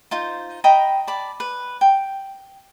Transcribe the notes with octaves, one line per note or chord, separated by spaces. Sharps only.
D#4 F4 C5
D#5 G5 A#5 B5
D5 A5 B5
B4
G5